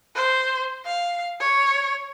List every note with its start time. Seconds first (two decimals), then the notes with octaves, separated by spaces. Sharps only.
0.16 C5
0.86 F5
1.40 C#5